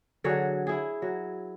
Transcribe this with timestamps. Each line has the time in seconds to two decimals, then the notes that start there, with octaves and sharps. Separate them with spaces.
0.24 D3 F#3 G#4 C#5
0.67 E4 G#4
1.02 F#3